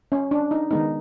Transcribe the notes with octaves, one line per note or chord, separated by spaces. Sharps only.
C#4
D4
D#4
D#3 G#3 B3 D#4